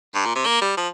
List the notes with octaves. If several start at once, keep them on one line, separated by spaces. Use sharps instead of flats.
G2
A#2
C3
A#3
G3
F3